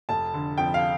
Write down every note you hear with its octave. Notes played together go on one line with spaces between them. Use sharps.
F1 A5
D3
F2 G5
F5